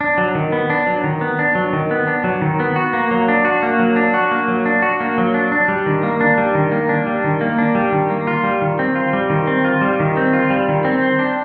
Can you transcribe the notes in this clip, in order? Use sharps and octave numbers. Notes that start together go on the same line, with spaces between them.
D4
F#3
D#3
B3
D4
F#3
D#3
B3
D4
F#3
D#3
B3
D4
F#3
D#3
B3
F#4
A#3
F#3
D4
F#4
A#3
F#3
D4
F#4
A#3
F#3
D4
F#4
A#3
F#3
D4
D4
G3
D#3
A#3
D4
G3
D#3
A#3
D4
G3
D#3
A#3
D4
G3
D#3
A#3
F4
G3
D#3
C4
F4
G3
D#3
C4
F4
G3
D#3
C4
F4
G3
D#3
C4
C5
D4